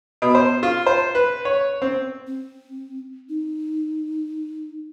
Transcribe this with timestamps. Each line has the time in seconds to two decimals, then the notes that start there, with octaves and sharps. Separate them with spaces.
0.22 B2
0.35 C5
0.63 F4
0.86 C5
1.15 B4
1.45 C#5
1.82 C4
2.27 C4
3.29 D#4